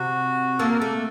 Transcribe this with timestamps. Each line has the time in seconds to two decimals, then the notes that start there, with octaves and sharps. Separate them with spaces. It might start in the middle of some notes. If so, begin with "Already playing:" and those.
Already playing: C3 F#4
0.59 A#3 A4
0.70 A#4
0.79 A3 A4